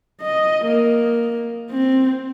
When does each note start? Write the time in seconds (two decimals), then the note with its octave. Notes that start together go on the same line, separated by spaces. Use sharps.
0.21 D#5
0.65 A#3
1.71 C4